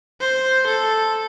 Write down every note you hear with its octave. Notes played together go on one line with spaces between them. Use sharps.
C5
A4